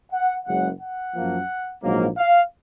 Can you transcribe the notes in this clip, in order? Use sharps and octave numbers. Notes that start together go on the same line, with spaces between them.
F#5
F#1 F#2 C#3 G#3 F#5
F#5
F#2 F3 A#3
A#1 G#2 F#3 A#3
F5